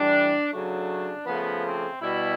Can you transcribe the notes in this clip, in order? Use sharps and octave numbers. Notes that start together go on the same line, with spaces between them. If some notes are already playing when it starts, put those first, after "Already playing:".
Already playing: A2 E3 G3 D4
C#3 F#3 A3 D4
C#3 F3 A3 B3
C4
B2 G3 E4